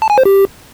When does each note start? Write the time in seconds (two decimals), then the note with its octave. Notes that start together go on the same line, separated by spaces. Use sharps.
0.02 A5
0.10 G#5
0.18 C5
0.25 G4